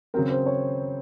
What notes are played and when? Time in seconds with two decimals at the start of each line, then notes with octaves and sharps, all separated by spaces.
0.14 C#3 F#3 C4 A#4
0.31 C5
0.46 C#5